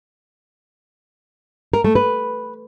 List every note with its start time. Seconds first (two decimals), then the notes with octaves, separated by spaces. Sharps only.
1.73 A#4
1.84 A3
1.95 B4